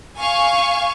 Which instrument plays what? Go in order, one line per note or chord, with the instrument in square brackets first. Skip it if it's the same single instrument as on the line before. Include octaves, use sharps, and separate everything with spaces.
[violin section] F5 G#5 C#6